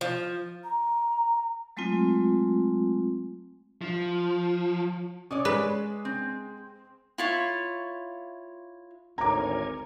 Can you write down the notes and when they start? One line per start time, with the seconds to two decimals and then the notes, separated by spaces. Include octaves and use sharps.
0.01 F3
0.64 A#5
1.77 F#3 G#3 A3 C4 F4
3.82 F3
5.31 C#4 C#5 D5 D#6
5.45 G#3 B4
6.05 C4
7.18 E4 F4 C#5
9.18 G#1 D2 A#4 C#5 G#5 A#5 D6